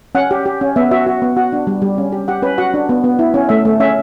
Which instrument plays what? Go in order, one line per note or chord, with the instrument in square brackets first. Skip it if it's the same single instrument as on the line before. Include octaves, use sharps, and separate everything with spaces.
[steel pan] C#4 F#5
G4
G4
C#4
B3 E5
F#4 E5
F#4
B3
F#4 F#5
D4
G3
G3
C#4
G4
G4 F#5
C#4 B4
F#4 F#5
D4
B3
B3
E4
C#4
A3 E5
A3
C#4 E5